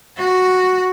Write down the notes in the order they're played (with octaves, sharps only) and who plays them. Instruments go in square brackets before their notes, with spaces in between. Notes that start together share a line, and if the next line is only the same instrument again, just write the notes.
[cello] F#4